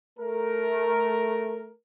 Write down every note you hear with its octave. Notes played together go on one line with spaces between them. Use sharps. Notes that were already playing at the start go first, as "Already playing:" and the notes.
A3 A#4